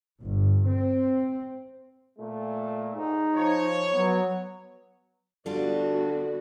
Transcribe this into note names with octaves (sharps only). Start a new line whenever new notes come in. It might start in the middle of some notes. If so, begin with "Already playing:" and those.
G1
C4
A#2 A3
G#2 D#4
F3 C#5
F#3 B3
D3 G3 B3 D4 F4 F#4